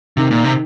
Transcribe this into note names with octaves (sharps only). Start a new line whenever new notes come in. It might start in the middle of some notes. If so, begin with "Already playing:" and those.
C3 D#3
A#2
C3